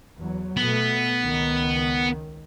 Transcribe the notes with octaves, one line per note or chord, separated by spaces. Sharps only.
E2 F#3
B2 A3 B3
C#2 D#3